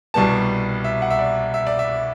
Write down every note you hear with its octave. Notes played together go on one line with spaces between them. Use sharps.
C2 B2 G3 B3 A5
E5
F#5
E5
D5
E5
D5
E5